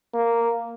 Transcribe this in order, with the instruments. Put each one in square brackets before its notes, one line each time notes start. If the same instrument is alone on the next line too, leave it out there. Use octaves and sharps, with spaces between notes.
[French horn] A#3